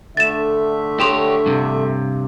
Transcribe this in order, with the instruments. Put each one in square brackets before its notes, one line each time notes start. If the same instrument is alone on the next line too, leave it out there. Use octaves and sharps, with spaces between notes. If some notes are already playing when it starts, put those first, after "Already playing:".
[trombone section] D3 [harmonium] A3 E5 [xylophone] A6 E7
[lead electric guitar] G4 C#5 [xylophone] A4 C6 F7
[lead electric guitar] G2 C3